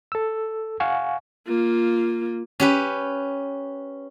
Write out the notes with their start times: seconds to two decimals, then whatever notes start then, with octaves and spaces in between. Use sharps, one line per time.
0.12 A4 E6
0.80 F5 F#5 G#5 C#6
1.47 A#3 F4
2.60 C#4 G4 B4